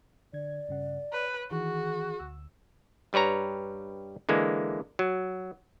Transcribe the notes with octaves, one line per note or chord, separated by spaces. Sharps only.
D3 D5 G#6
G2 C#3 F#5
B4 C#5
D#3 E3 F#4 G#4 C#6
D2 E6
G2 G3 B4 C#5 A#5
D3 E3 G#3 A#3
F#3